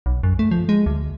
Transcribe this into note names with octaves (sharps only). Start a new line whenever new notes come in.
B1
F#2
A3
F3
G#3
D2